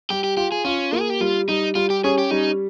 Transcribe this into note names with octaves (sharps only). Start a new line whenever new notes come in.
G3 G4
G4
F4 G4
G#4
C#4 F4
A#3
G#4
G4
G3 F4
G3 D#4
G3 F4
G4
C#4 G#4
G4
G3 D#4